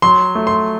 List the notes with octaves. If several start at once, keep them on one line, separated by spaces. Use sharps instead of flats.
F#3 C6
A3
C6